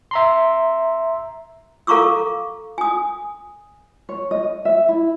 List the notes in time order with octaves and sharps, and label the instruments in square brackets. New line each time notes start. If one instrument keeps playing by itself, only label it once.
[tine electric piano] E5 A#5 C6
[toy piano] A4 F5 A#5 C#6 D6 E6
G#5 D#6
[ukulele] C#5
D#5
E5
E4